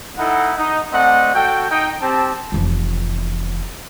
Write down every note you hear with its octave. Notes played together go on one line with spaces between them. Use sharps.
D#4 E4 A4 F#5
D#4
A3 C4 D5 D#5 F#5
F#4 A4 G5
D#4 D#5 G5
C4 G4 A5
F1 E3